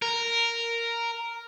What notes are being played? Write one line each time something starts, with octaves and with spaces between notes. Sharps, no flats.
A#4